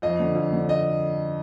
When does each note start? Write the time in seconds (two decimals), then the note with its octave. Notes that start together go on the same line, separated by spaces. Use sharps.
0.02 F2 D#5
0.20 D3
0.35 F2
0.53 D3
0.69 D#5